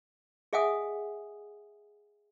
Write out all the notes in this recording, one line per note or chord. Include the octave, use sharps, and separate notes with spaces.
G#4 D#5 E5 F#5 G#5 D#6